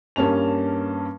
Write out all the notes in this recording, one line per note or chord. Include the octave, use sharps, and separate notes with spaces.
G2 A#3 C#4 A5 F7